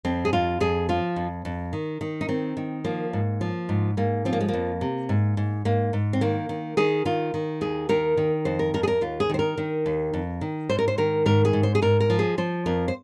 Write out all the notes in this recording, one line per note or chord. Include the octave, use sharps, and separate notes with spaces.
F2 C4
G#4
F2 F4
F2 G#4
F3 F4
F2
F2
D#3
D#3
D#4
D#3 C4
D#3
F3 A#3
G#2
F3
G#2
G#2 A#3
F3 C4
A#3
G#3
F2 A#3
C3
G#2
G#2
G#2 A#3
G#2
C4
D#3 A#3
D#3
D#3 G#4
D#3 F4
D#3
D#2 G#4
D#3 A#4
D#3
F2 C5
A#4
F2 A#4
G#4
A#4
D#2 F4
G#4
D#3 C5
A#4
D#3
D#2
F2
D#3
G#2 C5
A#4
C5
D#3 A#4
G#2 A#4
G#4
G#2
C5
G#4
G#2 A#4
A#4
F3
G#4
F3 C5
F2 A#4
C5